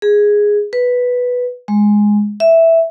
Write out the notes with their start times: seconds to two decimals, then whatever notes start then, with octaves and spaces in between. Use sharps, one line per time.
0.02 G#4
0.73 B4
1.68 G#3
2.40 E5